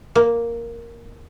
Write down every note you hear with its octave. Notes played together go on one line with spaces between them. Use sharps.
A#3